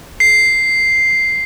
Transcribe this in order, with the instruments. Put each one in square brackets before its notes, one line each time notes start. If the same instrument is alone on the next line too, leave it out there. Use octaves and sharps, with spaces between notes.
[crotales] C7